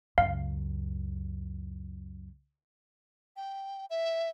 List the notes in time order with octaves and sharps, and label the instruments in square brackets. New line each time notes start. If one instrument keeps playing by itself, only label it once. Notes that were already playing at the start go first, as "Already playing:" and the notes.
[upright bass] C#2 F#2 [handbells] F5
[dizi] G5
E5